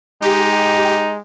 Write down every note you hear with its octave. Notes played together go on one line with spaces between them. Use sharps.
G#3 D#4 G4